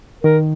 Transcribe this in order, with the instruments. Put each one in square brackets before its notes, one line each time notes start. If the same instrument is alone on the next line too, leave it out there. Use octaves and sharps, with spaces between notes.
[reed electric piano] D#3 [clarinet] A#4